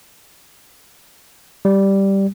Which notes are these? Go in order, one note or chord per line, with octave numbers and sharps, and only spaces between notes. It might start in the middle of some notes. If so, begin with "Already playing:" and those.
G3